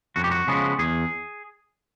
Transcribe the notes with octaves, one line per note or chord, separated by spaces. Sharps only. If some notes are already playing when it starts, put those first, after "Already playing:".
F2 F#4
G4
F#4
C#3 F3 G#3 B3
E2 G#4